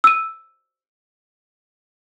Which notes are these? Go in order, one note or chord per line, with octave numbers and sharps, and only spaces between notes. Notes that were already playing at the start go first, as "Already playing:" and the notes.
E6 D#7